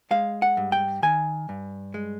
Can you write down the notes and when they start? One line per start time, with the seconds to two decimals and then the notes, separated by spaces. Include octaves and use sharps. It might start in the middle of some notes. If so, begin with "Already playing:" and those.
0.11 G#3 F5
0.42 F#5
0.57 G2
0.72 G5
1.03 D#3 G#5
1.49 G2
1.94 G#3